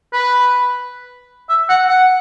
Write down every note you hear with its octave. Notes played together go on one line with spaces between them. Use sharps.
B4
E5
F#5
F#5